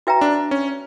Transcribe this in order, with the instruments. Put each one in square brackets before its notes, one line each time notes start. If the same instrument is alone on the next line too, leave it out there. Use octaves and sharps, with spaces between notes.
[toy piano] F#4 B4 E5 G5 A#5
[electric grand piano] D4
C#4